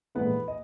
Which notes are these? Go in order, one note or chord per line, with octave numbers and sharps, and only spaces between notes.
A#1 G#2 E3 A3 B3 B4
D#5